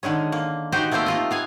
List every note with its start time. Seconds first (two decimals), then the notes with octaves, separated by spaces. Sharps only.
0.03 D3 D#3 G#3 C#4
0.32 A#3
0.72 D#4 F#4 G4 C5
0.91 A3 A#3 C4 G4 C5
1.06 A3 F4 D#5
1.31 B3 F5 G#5